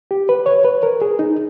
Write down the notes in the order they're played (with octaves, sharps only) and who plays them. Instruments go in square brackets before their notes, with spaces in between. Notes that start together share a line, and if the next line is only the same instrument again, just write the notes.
[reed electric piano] G4
B4
C#5
B4
A#4
G#4
D#4